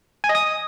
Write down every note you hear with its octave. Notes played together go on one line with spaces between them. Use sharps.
G#5
D#5
D#6